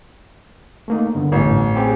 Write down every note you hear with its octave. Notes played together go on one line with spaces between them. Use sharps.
A3 A#3 D#4
G2 D3 B3
A1
C4 G4 G#4